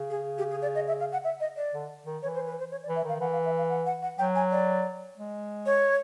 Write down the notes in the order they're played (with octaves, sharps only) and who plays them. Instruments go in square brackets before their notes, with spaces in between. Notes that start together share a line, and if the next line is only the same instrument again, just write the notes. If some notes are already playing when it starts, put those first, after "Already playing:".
Already playing: [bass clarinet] C#3
[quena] G#4
G4
G#4
D5
D#5
E5
F5
F#5
E5
D#5
D5
[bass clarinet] D3
D#3
[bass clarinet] E3 [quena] C#5
[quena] C5
B4
C5
C#5
D5
[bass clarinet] E3
[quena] E5
[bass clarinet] D#3 [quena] F5
[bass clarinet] E3 [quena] F#5
[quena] F5
E5
F5
F#5
F#5
F#5
[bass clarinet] F#3 [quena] G5
[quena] G#5
D5
[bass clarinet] G#3
[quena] C#5